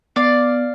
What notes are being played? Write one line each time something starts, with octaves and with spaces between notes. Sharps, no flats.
B3 D5 F5